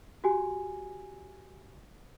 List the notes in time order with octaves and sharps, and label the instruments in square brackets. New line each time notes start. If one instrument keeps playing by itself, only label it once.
[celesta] F#4 G4 G#5